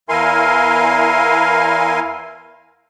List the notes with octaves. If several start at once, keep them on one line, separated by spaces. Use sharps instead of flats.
E2 E4 A#4 F5 G#5 C6